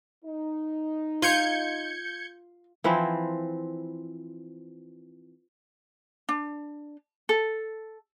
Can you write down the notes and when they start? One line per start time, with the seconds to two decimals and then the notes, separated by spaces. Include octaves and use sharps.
0.24 D#4
1.22 F4 G6 G#6 C#7
2.84 E3 F3 C4 E4
6.29 D4
7.29 A4